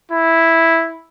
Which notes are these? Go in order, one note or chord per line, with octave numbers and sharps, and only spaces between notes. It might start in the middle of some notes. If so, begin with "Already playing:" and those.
E4